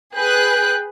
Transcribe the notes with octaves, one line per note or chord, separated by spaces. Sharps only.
G#4 B4 G5 F#6